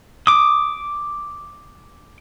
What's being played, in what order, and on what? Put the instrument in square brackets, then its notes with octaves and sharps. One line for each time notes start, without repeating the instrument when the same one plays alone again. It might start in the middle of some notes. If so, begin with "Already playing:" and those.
[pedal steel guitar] D6 D#6